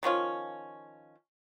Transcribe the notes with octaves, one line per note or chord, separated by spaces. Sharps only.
D#3 F3 C#4 F4